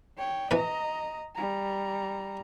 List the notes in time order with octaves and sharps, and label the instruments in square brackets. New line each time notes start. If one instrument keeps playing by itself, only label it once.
[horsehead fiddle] C#5 G5
[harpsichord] E3 B4 [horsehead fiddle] D#5 A#5
[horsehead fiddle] G3 A#5